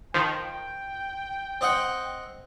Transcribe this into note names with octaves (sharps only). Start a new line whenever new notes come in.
D#3 F3 G5
C4 D#5 F#5